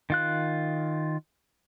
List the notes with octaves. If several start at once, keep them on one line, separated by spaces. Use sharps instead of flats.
D#3 F4 F#6